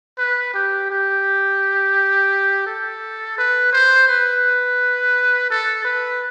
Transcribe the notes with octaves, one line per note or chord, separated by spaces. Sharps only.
B4
G4
G4
A4
B4
C5
B4
A4
B4